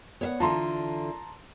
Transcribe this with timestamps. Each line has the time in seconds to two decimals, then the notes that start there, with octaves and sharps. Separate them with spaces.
0.21 B3 C#5 E5 F#5
0.40 D3 E3 F4 A5 A#5 C6